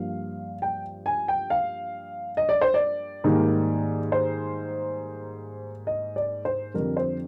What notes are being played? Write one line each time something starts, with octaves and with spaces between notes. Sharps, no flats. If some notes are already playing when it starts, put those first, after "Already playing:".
Already playing: G2 F3 A#3 F5
G5
G#5
G5
F5
D#5
D5
C5
D5
G#2 D#3 G3 A#3
C5
D#5
D5
C5
F2 D3 G3 A#4
C5